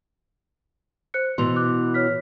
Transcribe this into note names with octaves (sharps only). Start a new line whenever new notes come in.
C5 F#6 C#7
B2 E3 C6 F7
D6 F#6
C#5 F6 B6